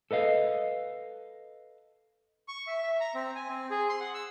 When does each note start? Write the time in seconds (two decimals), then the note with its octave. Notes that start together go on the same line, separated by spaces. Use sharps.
0.11 A4 B4 D#5 F5
2.48 C#6
2.67 E5
2.83 E5
3.00 A#5
3.15 C4
3.35 G#5
3.49 C4
3.70 G#4
3.89 C6
4.00 F#5
4.14 E6